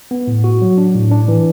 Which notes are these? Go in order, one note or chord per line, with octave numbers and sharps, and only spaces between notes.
B3
A2
F#4
F#3
D4
A2
D4
E3